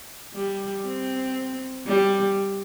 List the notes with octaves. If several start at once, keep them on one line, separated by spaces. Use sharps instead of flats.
G3
C4
G3